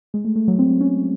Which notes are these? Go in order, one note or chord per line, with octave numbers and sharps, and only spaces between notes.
G#3
A3
A3
F#3
C4
C#4